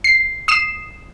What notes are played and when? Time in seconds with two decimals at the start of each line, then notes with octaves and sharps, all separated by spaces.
0.04 C7
0.48 D#6 C7 E7